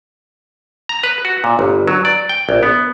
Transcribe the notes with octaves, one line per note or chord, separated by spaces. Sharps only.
A#5
B4
F#4
A#2
G1
F#3
D5
G5
A#1
B3